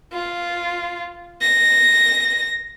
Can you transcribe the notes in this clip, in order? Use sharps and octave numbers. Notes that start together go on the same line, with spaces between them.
F4
A#6